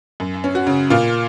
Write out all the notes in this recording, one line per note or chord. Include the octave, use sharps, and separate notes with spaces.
F#2
C#4
F#4
C#3
A#2 F4